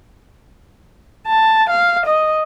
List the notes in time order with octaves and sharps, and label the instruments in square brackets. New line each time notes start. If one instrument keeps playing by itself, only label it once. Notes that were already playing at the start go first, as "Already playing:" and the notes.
[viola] A5
F5
D#5